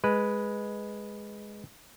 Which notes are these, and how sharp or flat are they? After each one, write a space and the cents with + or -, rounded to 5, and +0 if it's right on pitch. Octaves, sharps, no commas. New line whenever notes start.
G#3 +0 B4 +0